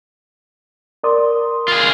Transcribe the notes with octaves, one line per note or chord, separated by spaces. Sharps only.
A#4 D5 C6 D#6
F4 G#4